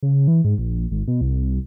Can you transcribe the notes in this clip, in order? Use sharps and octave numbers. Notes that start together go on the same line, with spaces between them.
C#3
E3
G#2
A#1
G#1
B2
C2